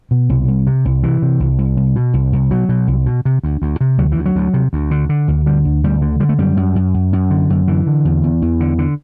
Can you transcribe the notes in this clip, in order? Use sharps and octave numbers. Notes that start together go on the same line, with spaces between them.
B2
C2
C2
C3
C2
C3 E3
C3
C2
C2
C2
B2
C2
C2
B2 F#3
B2
C2
B2
C3
D2
D2
C3
D2 F#3
D2 E3
F#3
D2
C3
D2
D3
D3
D2
D3 G3
D2
D2 G3
D3
D3 G3
A3
F#2 G3
F#2
F#2
F#2
F#2
D3
F#2
D3 E3
D3
E2
E2
E2
D3
D3